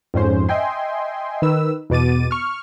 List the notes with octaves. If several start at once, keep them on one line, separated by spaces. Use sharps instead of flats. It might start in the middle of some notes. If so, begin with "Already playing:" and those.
F2 G#2 C#4 C5
D#5 E5 G5 G#5 C6
D#3 B4 E6
E2 B2 D6 A6 D#7
C#6 F6